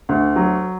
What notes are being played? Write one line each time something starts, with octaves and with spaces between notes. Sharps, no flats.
D2
F#3